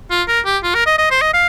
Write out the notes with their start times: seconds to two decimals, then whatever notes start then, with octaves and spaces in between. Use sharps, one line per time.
0.10 F4
0.28 A#4
0.45 G4
0.63 F4
0.74 A#4
0.86 D#5
0.98 D#5
1.10 C5
1.21 D#5
1.33 F5